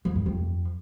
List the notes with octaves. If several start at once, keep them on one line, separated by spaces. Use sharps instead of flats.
E2
G2
F2